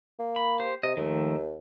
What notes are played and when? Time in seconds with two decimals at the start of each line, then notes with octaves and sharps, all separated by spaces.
0.19 A#3
0.36 B5
0.60 G4 C5
0.83 C3 D#5
0.97 D#2 D#3 F3 A3